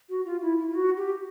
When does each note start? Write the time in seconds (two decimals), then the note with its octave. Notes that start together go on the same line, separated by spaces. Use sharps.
0.09 F#4
0.25 F4
0.42 E4
0.58 E4
0.69 F4
0.75 F#4
0.97 G4